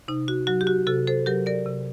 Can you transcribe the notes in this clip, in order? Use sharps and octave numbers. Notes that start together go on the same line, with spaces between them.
C3 D#4
F#4
F#3 F#4
G4
F#4
C3 F#4 A4
A4 C5
F#3 G4 A#4
A#4 D5
C3